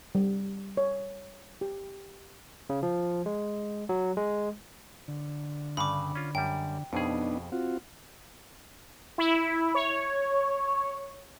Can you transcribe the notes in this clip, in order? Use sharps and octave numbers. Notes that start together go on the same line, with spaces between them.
G3
C#5
G4
C#3
F3
G#3
F#3
G#3
D3
G2 C#3 B5 D6
C#4 F4
F#2 G3 G5
F2 B2 B3 D4 D#4 G#4
C4 F4 F#4
E4
C#5